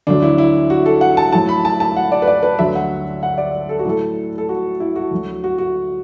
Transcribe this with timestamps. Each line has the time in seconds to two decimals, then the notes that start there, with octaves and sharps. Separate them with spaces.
0.07 D2 D3 F#3 D4
0.22 E4
0.38 E4
0.70 F#4
0.86 A4
1.01 F#5
1.17 A5
1.32 A2 F#3 A5
1.49 B5
1.65 A5
1.80 A5
1.96 F#5
2.12 D5
2.22 B4
2.27 D5
2.43 B4
2.59 D2 D3 F#3 E5
2.75 F#5
3.23 F#5
3.38 D5
3.69 A4
3.79 F#4
3.85 A2 F#3 A4
4.38 A4
4.49 F#4
4.80 E4
4.96 F#4
5.11 D2 D3 F#3
5.44 F#4
5.58 F#4